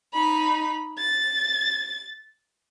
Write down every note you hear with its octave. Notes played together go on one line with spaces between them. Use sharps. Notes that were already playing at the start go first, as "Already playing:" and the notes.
D#4 B5
A6